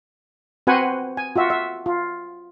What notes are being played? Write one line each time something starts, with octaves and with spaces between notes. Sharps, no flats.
C4 F#4 B4 C5 F#5 G#5
G#5
F4 F#4 E5
E5
F4